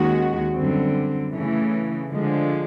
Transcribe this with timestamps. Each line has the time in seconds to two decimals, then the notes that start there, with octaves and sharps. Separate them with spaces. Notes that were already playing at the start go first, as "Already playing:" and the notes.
Already playing: D#2 D#3 G#3 C#4 F#4
0.54 F#2 D3 G3 C4
1.32 C#3 E3 A3 C#4
2.10 D3 F3 G#3